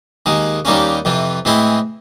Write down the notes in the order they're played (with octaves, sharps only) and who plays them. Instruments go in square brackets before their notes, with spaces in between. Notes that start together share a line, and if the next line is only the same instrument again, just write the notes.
[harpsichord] D#2 D#3 G#3
D#2 D#3 G3 A#3 C#4
F2 C3 E3
A2 E3 G#3 C4 E4